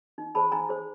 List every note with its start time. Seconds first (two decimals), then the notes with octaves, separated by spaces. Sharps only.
0.18 D#4
0.35 G#4 C5 A5 B5
0.52 D#4 G#5 A#5
0.69 G#4 C5